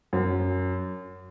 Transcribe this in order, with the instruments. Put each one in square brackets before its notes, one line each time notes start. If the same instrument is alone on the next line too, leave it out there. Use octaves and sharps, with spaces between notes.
[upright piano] F#2